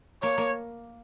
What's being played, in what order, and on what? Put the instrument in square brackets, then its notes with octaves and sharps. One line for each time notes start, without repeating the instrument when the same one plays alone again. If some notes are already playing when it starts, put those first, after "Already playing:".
[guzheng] A#3 [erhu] C#5
[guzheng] A#3